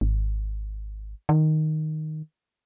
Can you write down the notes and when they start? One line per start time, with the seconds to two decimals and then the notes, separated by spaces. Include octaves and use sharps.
0.01 G#1
1.29 D#3